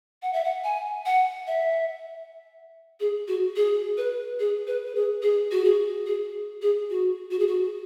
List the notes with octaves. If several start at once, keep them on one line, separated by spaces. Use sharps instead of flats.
F#5
E5
F#5
G#5
F#5
E5
G#4
F#4
G#4
B4
G#4
B4
B4
G#4
G#4
F#4
G#4
G#4
G#4
F#4
F#4
G#4
F#4